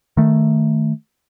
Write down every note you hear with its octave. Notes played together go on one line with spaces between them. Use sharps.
D#3 A3